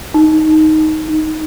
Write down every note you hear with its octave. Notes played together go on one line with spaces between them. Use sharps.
D#4
D#4